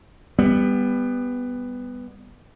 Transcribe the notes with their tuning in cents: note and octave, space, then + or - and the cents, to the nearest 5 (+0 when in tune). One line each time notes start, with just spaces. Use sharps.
G3 +25 B3 +5